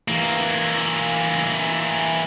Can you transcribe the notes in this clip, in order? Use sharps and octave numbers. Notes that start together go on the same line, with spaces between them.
E3 A#3